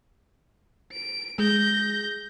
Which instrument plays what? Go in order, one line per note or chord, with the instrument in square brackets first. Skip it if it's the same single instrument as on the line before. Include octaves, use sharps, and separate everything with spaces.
[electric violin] D7
[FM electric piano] G#3 [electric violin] G6 A#6